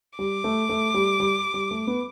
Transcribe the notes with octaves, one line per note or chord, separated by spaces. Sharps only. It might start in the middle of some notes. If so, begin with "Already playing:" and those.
G3 D6
A3
A3
G3
G3
G3
A3
B3